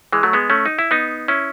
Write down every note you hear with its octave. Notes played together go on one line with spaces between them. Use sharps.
E3 G#3
F#3 A3
G#3 B3
A3 C#4
D#4
E4
B3 D#4
C#4 E4